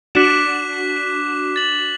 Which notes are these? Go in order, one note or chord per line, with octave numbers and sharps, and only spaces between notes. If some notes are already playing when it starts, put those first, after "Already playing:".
D4 F#4 D6 F#6 B6 E7
A6 F#7